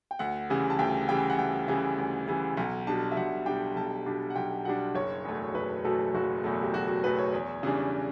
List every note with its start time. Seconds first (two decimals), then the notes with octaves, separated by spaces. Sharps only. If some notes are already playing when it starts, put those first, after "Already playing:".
0.11 G5
0.19 D2 F#5
0.50 C#3 E3 G3
0.70 A5
0.79 D2 G5
1.09 C#3 E3 G3 G5
1.30 F#5
1.38 D2 G5
1.68 C#3 E3 G3
1.98 D2
2.27 C#3 E3 G3
2.57 B1 F#5
2.87 B2 G3 D4 A5
3.12 E5
3.17 B1 F#5
3.46 B2 G3 D4 G5
3.76 B1 A5
4.06 B2 G3 D4
4.30 F#5
4.36 B1 G5
4.65 B2 G3 D4 F#5
4.95 F#1 C#5
5.25 E2 B2 F#3 A3
5.54 F#1 B4
5.84 E2 B2 F#3 A3 A4
6.14 F#1 F#4
6.44 E2 B2 F#3 A3
6.63 G4
6.74 F#1 F#4
6.88 F#4
7.04 E2 B2 F#3 A3 B4
7.19 C#5
7.33 E2
7.63 C#3 E3 G3 D4